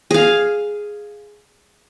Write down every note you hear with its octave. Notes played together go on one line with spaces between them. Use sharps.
G#4 F5